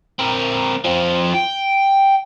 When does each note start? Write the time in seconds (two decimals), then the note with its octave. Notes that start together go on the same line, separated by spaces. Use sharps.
0.19 C4 A#4
0.85 F3 C4
1.35 G5